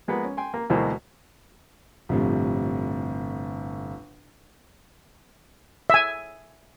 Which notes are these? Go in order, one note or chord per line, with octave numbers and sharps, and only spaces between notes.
F3 G#3 A#3 B3
C#4
G5 G#5 C6
A#3
D2 B2 E3 G#3 A#3 C5
G1 A2 C3 F3
E5 G#5